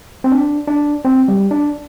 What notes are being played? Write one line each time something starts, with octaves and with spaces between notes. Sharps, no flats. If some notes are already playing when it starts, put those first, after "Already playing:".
C4
D4
D4
C4
G3
D4